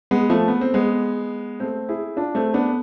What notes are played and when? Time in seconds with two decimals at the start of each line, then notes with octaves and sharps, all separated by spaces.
0.11 G#3 B3
0.30 F3 A3
0.48 B3
0.61 C4
0.74 G#3 B3
1.60 A3 C4
1.89 E4 G#4
2.17 D4 F4
2.35 A3 C4
2.54 B3 D4